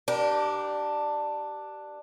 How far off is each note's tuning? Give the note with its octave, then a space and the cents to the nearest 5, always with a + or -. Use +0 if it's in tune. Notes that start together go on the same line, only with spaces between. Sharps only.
D4 +10 G4 -20 A#4 +35